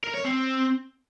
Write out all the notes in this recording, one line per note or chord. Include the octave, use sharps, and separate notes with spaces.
A#4
C#5
C4